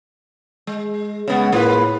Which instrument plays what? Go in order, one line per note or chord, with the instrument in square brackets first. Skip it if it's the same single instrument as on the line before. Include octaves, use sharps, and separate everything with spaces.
[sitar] G#3
[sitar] C#3 B3 [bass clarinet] G#3
[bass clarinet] A2 [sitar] A#3 F4 B4